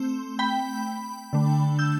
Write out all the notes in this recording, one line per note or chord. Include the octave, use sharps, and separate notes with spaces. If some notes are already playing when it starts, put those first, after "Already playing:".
Already playing: A3 C4 C6
G5 B5
D3 A3 D4
E6 G6